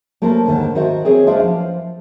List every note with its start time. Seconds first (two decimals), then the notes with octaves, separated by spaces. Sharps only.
0.22 A3 A#3 C#4 A#4 C5 A5
0.46 D#2 G#2 D3 D#3 A5
0.75 D#3 F#4 C5 E5
1.05 C4 G#4 C#5
1.26 G#3 D4 B4 C5 E5 F5
1.40 F3 F5